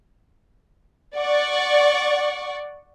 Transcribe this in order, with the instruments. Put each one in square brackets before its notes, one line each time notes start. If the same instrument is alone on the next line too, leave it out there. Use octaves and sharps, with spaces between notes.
[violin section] D5 F#5 C#6